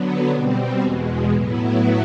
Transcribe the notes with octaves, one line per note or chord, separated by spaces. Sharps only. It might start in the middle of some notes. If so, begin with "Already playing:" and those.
Already playing: D3 F#3 B3
B2 G3 C4
E2 B2 G#3
A2 F#3 B3 E4